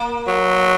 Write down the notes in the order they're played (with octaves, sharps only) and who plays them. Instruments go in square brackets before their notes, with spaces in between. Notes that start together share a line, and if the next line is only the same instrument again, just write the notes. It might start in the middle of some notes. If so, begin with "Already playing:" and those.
Already playing: [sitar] A#3
[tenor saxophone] F#3